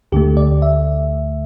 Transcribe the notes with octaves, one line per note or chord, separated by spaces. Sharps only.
D2 D3 A3 G4
D5
E5